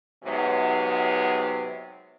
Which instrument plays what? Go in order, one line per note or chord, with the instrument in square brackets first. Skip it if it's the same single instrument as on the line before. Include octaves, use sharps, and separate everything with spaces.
[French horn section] G#2 C3 F#3 B3